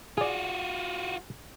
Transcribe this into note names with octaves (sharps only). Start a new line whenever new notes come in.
F4 F#4 G#4 D5